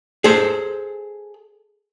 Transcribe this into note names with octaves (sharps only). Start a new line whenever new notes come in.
G#4 A4 C5